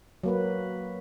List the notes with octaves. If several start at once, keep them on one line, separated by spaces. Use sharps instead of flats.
F#3 A#3 B4